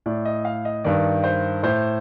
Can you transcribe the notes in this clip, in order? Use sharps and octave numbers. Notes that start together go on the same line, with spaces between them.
A2 D5
D#5
F5
D#5
G2 D#3 D5
C5
A2 C5